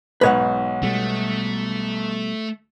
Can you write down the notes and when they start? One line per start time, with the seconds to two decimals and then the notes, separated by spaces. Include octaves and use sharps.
0.21 B1 G#2 B4 C#5 F#5
0.82 B2 G3 A3